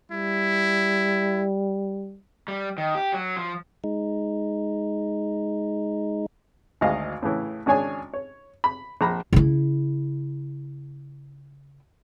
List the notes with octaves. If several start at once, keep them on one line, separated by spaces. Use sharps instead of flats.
G3 E4
G3
D#3
G4
F#3
F3
G#3 D#4
G#1 D2 G#4 D#5 F5
A2 C#3 E3
G#1 C#4 D4 G#4 C#5 G#5
C#5
B5
A#1 A#5 B5
C#3 E4